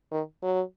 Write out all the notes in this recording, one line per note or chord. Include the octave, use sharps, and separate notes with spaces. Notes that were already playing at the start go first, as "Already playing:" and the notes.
D#3
F#3